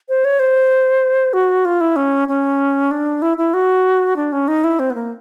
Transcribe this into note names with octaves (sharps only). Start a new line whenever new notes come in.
C5
C#5
C5
F#4
F4
E4
C#4
C#4
D4
E4
E4
F#4
D4
C#4
D#4
E4
C4
B3
A#3